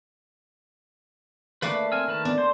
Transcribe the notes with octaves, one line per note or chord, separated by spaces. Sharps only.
A3 A#3 D4 B4 F5 D6
C4 G#5 E6 F6
D#3 B4 A5
B3 D4
C5 C6